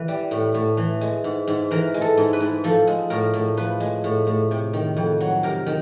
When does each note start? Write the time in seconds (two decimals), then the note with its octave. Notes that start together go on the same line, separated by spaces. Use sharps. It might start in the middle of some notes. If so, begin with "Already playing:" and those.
Already playing: E3 B4
0.08 G3
0.31 A2
0.54 A2
0.77 E3
1.01 G#3
1.24 G#2
1.48 G#2
1.71 E3 A#4
1.94 G#3
2.01 A4
2.17 G#2
2.33 B4
2.40 G#2
2.64 F3 A4
2.87 G#3
3.10 A2 A#4
3.34 A2
3.57 F3 B4
3.80 G#3
4.04 A2
4.27 A2
4.51 C3
4.73 D#3
4.96 F2
5.20 F#3
5.43 C3 A#4
5.66 D#3